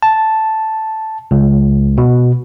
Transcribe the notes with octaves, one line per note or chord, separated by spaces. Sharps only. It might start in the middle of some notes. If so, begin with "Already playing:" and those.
A5
C#2
B2